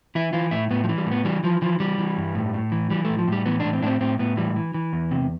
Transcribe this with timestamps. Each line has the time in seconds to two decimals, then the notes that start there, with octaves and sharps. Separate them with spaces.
0.15 E3 E4
0.33 E3 F4
0.51 A2 E4
0.71 A2 B3
0.84 F3
0.89 E3
0.98 G3
1.07 A2 B3
1.25 E3 G3
1.44 E3 F3
1.62 E3 F3
1.80 E3 G3
1.98 E3
2.18 G2
2.35 A2
2.54 A2
2.72 E3
2.90 E3 G3
3.05 A3
3.09 A2
3.18 F3
3.28 A2 G3
3.46 E3 B3
3.60 A2 D4
3.73 C4
3.82 A2 D4
3.87 C4
4.01 A2 C4
4.19 A2 B3
4.37 E3 G3
4.56 E3
4.74 E3
4.93 E2
5.11 C3